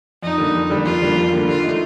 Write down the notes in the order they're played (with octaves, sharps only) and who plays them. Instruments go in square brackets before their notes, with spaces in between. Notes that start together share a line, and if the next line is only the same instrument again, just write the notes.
[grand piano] F2 [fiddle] D#4
[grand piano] D3 G3 A#3
F2
D3 G3 A#3
[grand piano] F2 [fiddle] F4
[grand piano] D3 G3 A#3
F2
D3 G3 A#3
[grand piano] D3 [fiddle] F4
[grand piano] A3 D#4